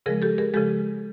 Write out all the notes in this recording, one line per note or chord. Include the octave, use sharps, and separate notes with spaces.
C#3 F3 G#3 G#4 A#4
G4 A4
G#4 A#4
C#3 F3 G#3 G4 A4